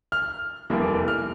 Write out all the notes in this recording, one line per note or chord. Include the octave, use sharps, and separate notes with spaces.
F6
F1 E2 E3 G3 A#3
F6